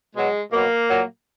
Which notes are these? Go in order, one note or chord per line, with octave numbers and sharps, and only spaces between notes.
B2 F#3 G#3
B2 F#3 A#3
A#2 F#3